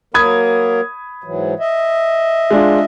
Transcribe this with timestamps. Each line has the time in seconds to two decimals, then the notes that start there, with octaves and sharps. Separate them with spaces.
0.14 F#3 A#3 A#4 B5 D#6 G#6
1.24 G#2 E3 F#3
1.59 D#5 E5
2.51 G#3 D4 F4